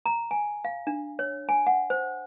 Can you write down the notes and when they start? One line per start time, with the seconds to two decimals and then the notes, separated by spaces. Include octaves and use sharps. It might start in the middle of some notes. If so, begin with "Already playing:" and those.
0.06 A#5
0.31 G#5
0.65 F5
0.87 D4
1.19 C#5
1.49 G#5
1.67 F#5
1.90 C5